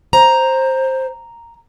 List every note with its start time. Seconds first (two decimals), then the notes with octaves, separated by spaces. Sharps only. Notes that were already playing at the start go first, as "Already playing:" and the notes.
0.13 C5 A#5